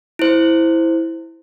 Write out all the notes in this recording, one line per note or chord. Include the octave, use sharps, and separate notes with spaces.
E4 C5